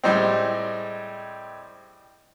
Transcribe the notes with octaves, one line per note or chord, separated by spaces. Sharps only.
A2 G3 G#3 C4